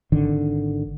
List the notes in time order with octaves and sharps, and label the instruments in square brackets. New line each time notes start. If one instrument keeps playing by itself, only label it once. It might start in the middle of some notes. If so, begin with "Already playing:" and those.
[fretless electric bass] G#1 D3 D#3